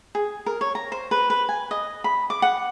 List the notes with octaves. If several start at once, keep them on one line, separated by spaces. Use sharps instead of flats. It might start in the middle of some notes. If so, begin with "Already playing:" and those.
G#4
A#4
C#5
A#5
C5
B4
B4
G#5
D#5
B5
D6
F#5